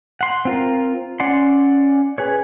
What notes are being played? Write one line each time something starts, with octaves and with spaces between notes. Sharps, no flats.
F#5 C6
C4 F4 A#4
C#4 D5 F#5 C6
G#4 B4 C#5